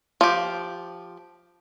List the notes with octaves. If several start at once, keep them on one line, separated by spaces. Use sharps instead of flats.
F3 G4